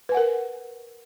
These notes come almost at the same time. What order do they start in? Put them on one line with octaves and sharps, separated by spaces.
B4 G#5 F#5 A#4